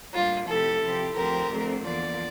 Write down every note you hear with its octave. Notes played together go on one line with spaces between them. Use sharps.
A2 G3 A#3 D4 F4
C3 F3 A3 E4 G4 A4
C3 F3 C4 E4 G4
D2 D3 F3 C4 G4 A#4
F2 D3 A3 C4
E2 D3 F3 A#3 D5